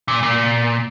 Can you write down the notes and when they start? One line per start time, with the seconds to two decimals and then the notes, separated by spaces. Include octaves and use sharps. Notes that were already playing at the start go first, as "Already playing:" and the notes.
0.08 A#2
0.23 A#2